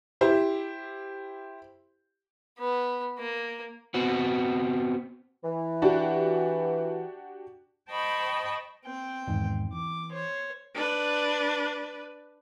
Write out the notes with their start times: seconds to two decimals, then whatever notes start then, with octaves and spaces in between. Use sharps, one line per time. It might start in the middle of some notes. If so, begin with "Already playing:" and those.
0.21 E4 G4 C5
2.59 B3
3.19 A#3
3.94 B3 C4 F#4
5.44 E3
5.82 D4 F#4 G4
7.90 C5 D#5 G5 A5 B5 C#6
8.85 C4 G5
9.28 E2 G#2 D#3
9.73 E3 D6
10.12 C5 C#5
10.75 D4 B4